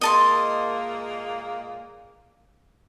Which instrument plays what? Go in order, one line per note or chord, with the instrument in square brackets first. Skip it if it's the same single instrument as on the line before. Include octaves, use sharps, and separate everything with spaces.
[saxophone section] A#2 G#3 A#3 [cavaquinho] D#5 A5 C6